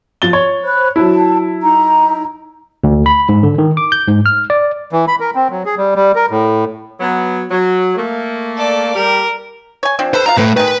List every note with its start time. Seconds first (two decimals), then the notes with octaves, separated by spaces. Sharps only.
0.22 F3 A6 G7
0.33 C#5
0.64 C5 B5 F#6
0.96 F#3 E4 A5
1.62 D#4 A#5
2.84 D2
3.06 B5
3.29 G#2
3.43 D3
3.58 D#3
3.77 D6
3.92 G6
4.07 G#2
4.26 F6
4.50 D5
4.93 E3
5.08 B5
5.20 A#4
5.35 C4
5.51 F#3
5.65 G#4
5.78 G3
5.96 G3
6.15 A#4
6.31 A2
7.00 F#3 B3
7.50 F#3
7.96 A3 A#3
8.58 A4 D5
8.95 G3 A#4
9.83 C#5 G#5
9.99 F3 C4 D4
10.14 A4 B4 C5
10.26 B2 F4 F5 A#5
10.37 A2 A3 B4
10.56 D#3 G#3 B4